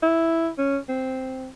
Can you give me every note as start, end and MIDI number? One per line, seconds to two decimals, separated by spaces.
0.03 0.49 64
0.58 0.78 61
0.89 1.49 60